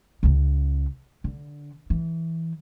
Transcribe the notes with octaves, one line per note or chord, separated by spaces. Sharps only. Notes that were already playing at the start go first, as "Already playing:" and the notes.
C#2 C#3
D3
E3